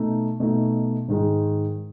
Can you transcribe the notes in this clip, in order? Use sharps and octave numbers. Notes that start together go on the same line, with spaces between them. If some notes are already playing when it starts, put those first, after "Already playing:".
Already playing: B2 A3 D#4
B2 A3 D#4
G#2 D#3 G#3 D#4